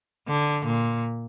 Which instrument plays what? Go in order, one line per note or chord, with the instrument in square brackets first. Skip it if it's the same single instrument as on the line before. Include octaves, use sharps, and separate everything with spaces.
[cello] D3
A#2